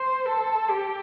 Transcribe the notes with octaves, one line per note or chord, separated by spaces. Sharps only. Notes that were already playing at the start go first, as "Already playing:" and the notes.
Already playing: C5
A4
G4